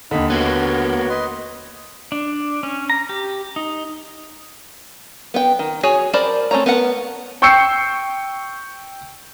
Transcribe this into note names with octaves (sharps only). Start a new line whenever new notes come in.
D#2 D3 D#4 B5
A#3 B3 F#4 C#5
B4 D#5 C6
D4
C#4
A#5
G4
D#4
B3 G5
D#3
F#4 G#4 C#5 G#5
A#4 C5 D5 A5 B5
A3 C4 C#4 C#5 A#5
B3 A#4 F#5
G5 C#6 E6 G6 C7 C#7